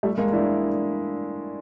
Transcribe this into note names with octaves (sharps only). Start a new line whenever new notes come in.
G3 A3
G#3 A#3
D4 E4